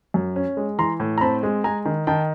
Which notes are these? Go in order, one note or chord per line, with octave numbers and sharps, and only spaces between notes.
F#2
C#4
G#3
E3 A#5 C6
A2
A#5
C4 A5 B5
G#3
G#3 G#5 A#5
D#3
D#3 G5 A5